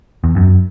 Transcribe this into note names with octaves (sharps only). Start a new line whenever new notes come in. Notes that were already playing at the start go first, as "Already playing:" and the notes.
E2
F#2